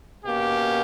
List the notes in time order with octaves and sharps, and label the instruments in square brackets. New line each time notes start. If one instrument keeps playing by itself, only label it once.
[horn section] B2 A#3 C#4 G4